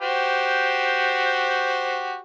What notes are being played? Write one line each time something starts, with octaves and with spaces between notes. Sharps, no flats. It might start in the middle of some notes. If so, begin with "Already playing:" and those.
F#4 G4 C5